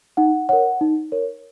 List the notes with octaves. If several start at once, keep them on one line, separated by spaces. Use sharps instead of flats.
D#4 F#5
A#4 C#5 F#5
D#4
A#4 C#5